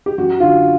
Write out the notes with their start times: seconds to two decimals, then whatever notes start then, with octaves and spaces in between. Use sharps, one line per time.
0.06 G4
0.18 F#2 F#4
0.40 D3 F4